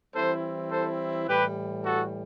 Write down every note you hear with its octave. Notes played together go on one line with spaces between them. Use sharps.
E3 G3 C4 E4 A4 C5
A4 C5
A2 E3 G3 G4 B4
F#4 A4